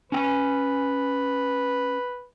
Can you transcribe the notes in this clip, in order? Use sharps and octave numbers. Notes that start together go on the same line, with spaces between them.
C#4 B4 G5 G#5